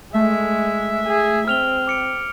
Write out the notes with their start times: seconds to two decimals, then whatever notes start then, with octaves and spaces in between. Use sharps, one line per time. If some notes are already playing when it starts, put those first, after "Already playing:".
0.14 G#3 A3 E5
1.06 G#4
1.48 C4 F6 F7 G7
1.87 D6 C#7 D7